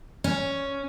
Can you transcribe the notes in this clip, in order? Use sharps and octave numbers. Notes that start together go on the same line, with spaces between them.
C#4